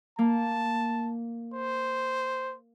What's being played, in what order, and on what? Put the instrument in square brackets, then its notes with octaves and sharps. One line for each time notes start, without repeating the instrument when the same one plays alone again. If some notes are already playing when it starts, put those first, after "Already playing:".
[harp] A#3 [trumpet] A5
[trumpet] C5